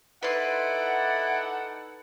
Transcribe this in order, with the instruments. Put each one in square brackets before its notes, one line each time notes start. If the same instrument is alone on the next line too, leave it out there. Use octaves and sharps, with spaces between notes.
[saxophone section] D#4 A4 F#5 [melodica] E4 D5 [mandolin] B4 C6